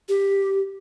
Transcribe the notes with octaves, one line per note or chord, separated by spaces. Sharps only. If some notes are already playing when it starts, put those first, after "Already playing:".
G4